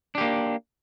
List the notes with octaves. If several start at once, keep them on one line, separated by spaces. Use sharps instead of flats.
A#3 D4 G4